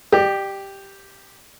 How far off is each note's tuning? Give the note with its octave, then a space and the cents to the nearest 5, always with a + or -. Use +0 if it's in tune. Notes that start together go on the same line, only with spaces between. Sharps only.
G4 +0 D5 +40